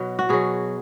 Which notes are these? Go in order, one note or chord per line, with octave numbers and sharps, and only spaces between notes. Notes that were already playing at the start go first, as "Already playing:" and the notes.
Already playing: B2 F#3
F#4
B2 F#3 G#4